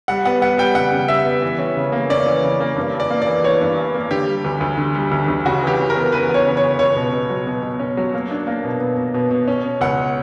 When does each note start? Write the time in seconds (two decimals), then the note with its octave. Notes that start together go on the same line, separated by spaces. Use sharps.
0.08 G3 F#5
0.25 B3 F#5
0.41 G3 F#5
0.58 G3 G5
0.75 C#3 F#5
0.92 C#3
1.08 G3 E5
1.25 B3
1.42 E3
1.59 C#4
1.77 C#3
1.92 A#3
2.10 C#4 D5
2.26 E3
2.43 C#3
2.60 A#3
2.76 G2
2.94 E3
3.00 D5
3.10 A#3
3.22 D5
3.27 E3
3.44 E3 C#5
3.61 G2
3.78 E3
3.94 A#3
4.11 D3 G4
4.28 G3
4.44 D2
4.61 D2
4.77 D3
4.95 G3
5.11 D2
5.28 D2
5.45 C#3 F#4
5.62 E3 G4
5.79 C#3
5.90 A#4
5.96 B3
6.12 E3 B4
6.29 B3 C#5
6.46 C#3
6.57 C#3 C#5
6.79 C#2 C#5
6.96 B2
7.13 B2
7.30 F#3
7.47 B2
7.63 B2
7.80 C#4
7.97 F#3
8.14 A#3
8.31 D4
8.47 A#3
8.64 B2
8.81 B2
8.97 B2
9.14 B2
9.31 B2
9.48 C#4
9.64 B2
9.81 C#2 F#5